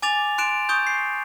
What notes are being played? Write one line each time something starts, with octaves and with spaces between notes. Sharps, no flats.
G#5 D6 A6 F7
C6 F#6 D7 E7
C#6 D#6 G6
C7